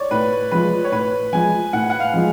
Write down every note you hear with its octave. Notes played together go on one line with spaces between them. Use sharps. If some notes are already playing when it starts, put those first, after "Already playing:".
Already playing: C#5 D5
A2 B4
F3 G#3 B4
C#5
A2 B4
F3 G#3 G#5
A2 F#5
F#5
F5
F3 G#3